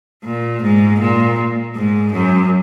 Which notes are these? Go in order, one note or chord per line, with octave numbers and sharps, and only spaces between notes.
A#2
G#2
A#2
G#2
F#2